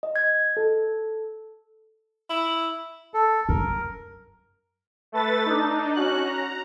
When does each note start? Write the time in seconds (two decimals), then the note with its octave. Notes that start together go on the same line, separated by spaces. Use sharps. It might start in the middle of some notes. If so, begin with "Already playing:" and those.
0.03 D#5
0.16 G#6
0.57 A4
2.30 E4
3.14 A4
3.49 F#2 A#4
5.12 A3 A4 B4 A6
5.46 D4 D#4
5.94 C#4 F#4 F#6
6.25 A#5